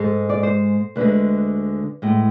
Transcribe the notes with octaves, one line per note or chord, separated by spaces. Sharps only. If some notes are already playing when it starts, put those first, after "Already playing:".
Already playing: G#2 G#3 A4
D5
C5
D2 D3 G#3 B4
A2 G#3